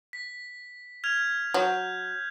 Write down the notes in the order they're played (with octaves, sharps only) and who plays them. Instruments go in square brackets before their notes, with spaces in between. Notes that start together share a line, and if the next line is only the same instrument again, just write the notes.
[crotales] B6
F6 G#6 F7
[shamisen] F#3 [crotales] G6